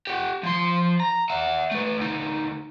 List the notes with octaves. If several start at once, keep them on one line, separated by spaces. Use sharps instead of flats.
G4 F#5
F3 C6
A#5
E5 F#5
A3 B4
D2 D#4